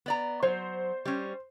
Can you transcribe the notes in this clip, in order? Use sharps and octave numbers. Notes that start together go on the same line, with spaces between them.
B3 D5 A#5
F#3 C5
G3 C#4